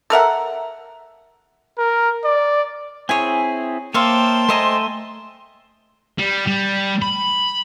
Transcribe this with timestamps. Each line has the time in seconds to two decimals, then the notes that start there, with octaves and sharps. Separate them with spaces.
0.10 A4 A#4 E5 F#5
1.78 A#4
2.24 D5
3.09 C4 E4 G#4 C#5 G#5
3.94 A#3 C5 C#5 E5 F5 G5 A5 C6
4.49 A3 C5 D#5 E5 G#5 A#5
6.19 G3
6.47 G3
7.02 B5